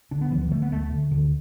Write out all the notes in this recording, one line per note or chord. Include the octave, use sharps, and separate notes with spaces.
D3 D4
B3
D2 E3
E3
D3 A3
B3
D2 A3
D3
D2 D3